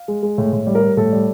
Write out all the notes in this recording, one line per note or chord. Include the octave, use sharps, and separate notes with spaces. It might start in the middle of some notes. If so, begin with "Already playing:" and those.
Already playing: F5
G#3
G#3
A2
A2
G3
A#4
G3
A2 A4
G3